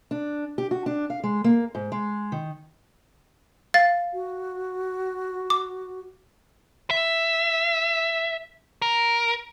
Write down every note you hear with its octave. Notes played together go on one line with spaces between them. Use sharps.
D4
G4
F#4
D4
F5
G#3
A#3
G#2
G#3
D#3
F5 A6
F#4
D6
E5
A#4